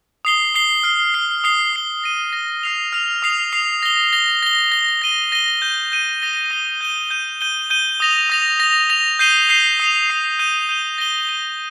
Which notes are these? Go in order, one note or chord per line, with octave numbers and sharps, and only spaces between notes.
D#6 C7 G7
D#6 C7 G7
F6 C7 G7
F6 C7 G7
D#6 C7 G7
D#6 C7 G7
A#6 D#7 G7
A#6 D#7 G7
F6 C7 F7
F6 C7 F7
D#6 C7 F7
D#6 C7 F7
A#6 G7
A#6 G7
A#6 G7
A#6 G7
A#6 D#7 G7
A#6 D#7 G7
G6 D#7 G7
G6 D#7 G7
D#6 A#6 G7
D#6 A#6 G7
G6 D#7 G7
G6 D#7 G7
G6 D#7 G7
G6 D#7 G7
D#6 A#6 F7
D#6 A#6 F7
A#6 F7
A#6 F7
G6 C7 D#7 G7
G6 C7 D#7 G7
D#6 C7 F7
D#6 C7 F7
G6 D#7 G7
G6 D#7 G7
A#6 D#7 G7
A#6 D#7 G7